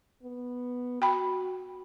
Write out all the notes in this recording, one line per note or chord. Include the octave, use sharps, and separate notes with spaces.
B3
F#4 G5 B5